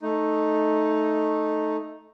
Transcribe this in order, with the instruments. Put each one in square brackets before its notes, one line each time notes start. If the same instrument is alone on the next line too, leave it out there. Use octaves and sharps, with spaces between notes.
[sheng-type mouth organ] A3 D#4